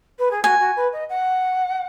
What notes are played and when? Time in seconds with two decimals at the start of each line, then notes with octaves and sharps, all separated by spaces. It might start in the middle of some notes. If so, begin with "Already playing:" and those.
0.19 B4
0.31 G#4
0.44 F#4 G#5
0.60 F#4
0.76 B4
0.93 D#5
1.09 F#5